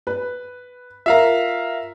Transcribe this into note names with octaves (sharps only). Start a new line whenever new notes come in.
B4
F4 A#4 E5 F5 A#5